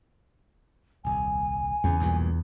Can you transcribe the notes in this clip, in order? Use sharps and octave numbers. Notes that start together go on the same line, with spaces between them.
D#1 C2 G#5
E2 C#3
B1 G2 A#2